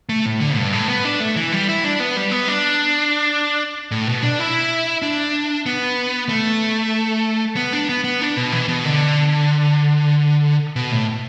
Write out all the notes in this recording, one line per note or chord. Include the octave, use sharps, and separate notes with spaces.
A3
A2
D3
G2
A2
B3
D4
A3
E3
G3
E4
D4
B3
G3
B3
D4
A2
B2
D4
E4
D4
B3
A3
B3
D4
B3
B3
D4
B2
E3
B2
D3
B2
A2